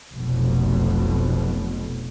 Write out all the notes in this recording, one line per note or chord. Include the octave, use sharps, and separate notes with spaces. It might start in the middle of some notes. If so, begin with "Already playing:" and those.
F1 B1 B2